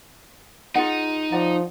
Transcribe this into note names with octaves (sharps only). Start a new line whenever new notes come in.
D#4 F4 G#4 F#5
F3 D5 F#5 A#5